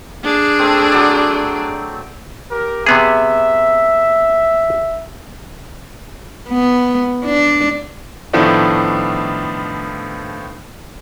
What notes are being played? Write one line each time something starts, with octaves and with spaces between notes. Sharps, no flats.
D4 G#4
A3 C4
F#3 D5
G4 A#4
C3 B3 G#4 E5
B3
D4
A2 D#3 F3 A3 B3 D4